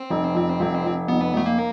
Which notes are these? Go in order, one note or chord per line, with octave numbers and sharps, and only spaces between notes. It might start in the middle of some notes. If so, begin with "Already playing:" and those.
Already playing: C4
F1
F2
F1
F2
F1 B3
F1 A3
A#3